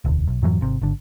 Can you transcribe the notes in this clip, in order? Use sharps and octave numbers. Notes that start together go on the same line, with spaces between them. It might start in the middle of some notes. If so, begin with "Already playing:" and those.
E1 D2
B1
F2 G#2 E3 F#3
G#1 C3
G#1 D3